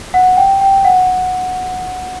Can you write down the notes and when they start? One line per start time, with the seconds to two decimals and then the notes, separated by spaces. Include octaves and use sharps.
0.14 F#5
0.37 G5
0.61 G5
0.85 F#5